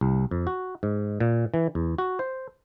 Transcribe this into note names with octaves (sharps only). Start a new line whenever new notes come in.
C2
F2
F#4
G#2
A#2
E3
E2
F#4
C5